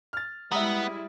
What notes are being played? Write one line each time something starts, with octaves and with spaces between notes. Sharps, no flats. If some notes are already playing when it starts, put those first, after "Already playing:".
F6 A6
G3 G#3 B3 E4 E5 A#5 D#6